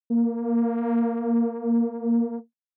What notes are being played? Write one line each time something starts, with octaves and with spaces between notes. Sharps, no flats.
A#3